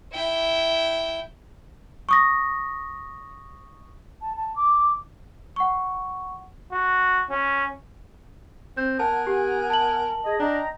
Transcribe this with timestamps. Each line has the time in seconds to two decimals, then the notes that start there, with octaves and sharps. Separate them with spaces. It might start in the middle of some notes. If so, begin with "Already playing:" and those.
0.13 E4 G5
2.09 C#6 D#6 A#6
4.20 A5
4.36 A5
4.56 D6
5.56 F#5 C#6
6.73 F#4
7.31 C#4
8.77 C4 G6
8.99 B3 A#4 F#5 G#5 A5
9.27 G4
9.70 A5 F#7
10.25 G#4 D#5
10.40 D4 D#5 G5 A#5